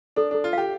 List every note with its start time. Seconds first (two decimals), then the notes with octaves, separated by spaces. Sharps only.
0.16 D4 A4
0.31 D4 A4
0.44 F4
0.53 G4 F5